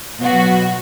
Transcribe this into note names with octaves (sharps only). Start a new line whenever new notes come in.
B2 F#3 F#4